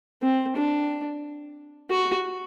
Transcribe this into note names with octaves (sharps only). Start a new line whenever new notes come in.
C4
D4
F#4